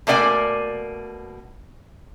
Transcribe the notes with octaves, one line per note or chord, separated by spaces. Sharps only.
B2 A3 A#3 D5 F#5 G#5